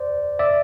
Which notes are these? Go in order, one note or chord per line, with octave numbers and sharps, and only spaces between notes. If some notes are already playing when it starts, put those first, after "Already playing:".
Already playing: C5 D5
D5 E5